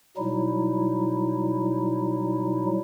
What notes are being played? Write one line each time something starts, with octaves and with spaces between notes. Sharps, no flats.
B2 F#3 G3 D#4 E4